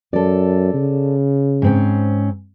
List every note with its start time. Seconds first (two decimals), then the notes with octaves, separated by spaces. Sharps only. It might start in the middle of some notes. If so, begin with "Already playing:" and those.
0.13 F#2 A4 D5
0.74 C#3
1.62 G#2 C4 C#4